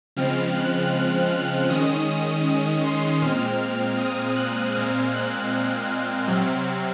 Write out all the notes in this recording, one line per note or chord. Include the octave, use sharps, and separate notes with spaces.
C#3 F3 G#3 C4 F6
F#6
F6
D#3 G#3 C#4 D#6
D#6
C6
A#2 G#3 C4 F6
F6
D#6
F#6
A#2 G#3 C4 F6
F#6
F6
C3 F#3 C4 F6